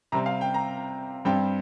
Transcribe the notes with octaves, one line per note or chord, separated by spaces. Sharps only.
C3 G3 C4 A#5
F5
G5
A#5
G2 G3 C4 G5